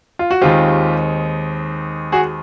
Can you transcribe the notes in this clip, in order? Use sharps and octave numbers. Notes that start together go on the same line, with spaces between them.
F4
F#4
D#2 D#3 G#3 C4 F4 G4
F#4 G#4